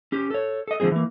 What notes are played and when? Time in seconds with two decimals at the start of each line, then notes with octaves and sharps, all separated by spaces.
0.12 C#4 G4
0.30 A4 C#5
0.68 A4 D#5
0.80 D3 F3 G#3 C4 G#4
0.92 E3 A#3